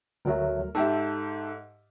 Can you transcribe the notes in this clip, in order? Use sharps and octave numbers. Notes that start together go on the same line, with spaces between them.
D2 F#3 A3 A#4
G#2 G4 A4 E5